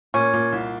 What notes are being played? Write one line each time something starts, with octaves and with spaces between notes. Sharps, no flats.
A#2 C#4
A#2
C2